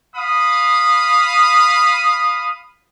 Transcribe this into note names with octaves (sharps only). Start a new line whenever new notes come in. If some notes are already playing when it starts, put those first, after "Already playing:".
F5 B5 D#6